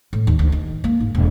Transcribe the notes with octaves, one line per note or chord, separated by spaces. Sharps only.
A2
D#2
D2
D#3
A#3
G#2
E1